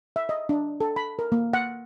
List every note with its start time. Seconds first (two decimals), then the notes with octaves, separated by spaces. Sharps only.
0.16 E5
0.29 D#5
0.49 D4
0.81 A4
0.96 B5
1.19 A#4
1.32 A#3
1.53 F#5